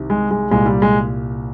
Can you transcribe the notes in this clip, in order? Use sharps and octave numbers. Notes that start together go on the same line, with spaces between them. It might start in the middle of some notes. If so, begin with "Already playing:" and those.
Already playing: C2 C3 D#3
G#3
G#3
C2 A#2 G#3
G3
G#3